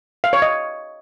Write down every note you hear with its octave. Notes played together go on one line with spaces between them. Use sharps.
F5
C#5
D#5